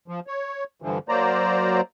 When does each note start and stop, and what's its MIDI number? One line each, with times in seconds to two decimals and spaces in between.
0.08 0.20 53
0.27 0.64 73
0.82 0.98 43
0.82 0.98 50
0.82 0.98 52
0.82 0.98 53
1.09 1.81 54
1.09 1.81 58
1.09 1.81 72
1.09 1.81 74
1.09 1.81 82